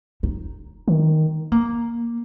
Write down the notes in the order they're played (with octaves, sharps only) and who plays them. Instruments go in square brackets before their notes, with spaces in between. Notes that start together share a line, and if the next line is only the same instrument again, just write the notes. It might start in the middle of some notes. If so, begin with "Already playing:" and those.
[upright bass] D#4
[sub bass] D#3
[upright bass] A#3